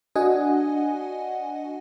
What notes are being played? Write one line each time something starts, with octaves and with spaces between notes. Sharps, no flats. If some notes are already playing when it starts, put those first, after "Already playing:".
D4 F#4 D#5 F#5 G#5